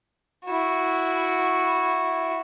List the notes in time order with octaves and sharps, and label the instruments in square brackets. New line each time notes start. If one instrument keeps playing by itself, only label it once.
[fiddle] E4 F#4